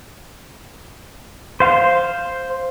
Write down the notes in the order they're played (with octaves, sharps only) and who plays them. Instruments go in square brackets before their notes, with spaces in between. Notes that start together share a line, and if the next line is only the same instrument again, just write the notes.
[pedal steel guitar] C5 F5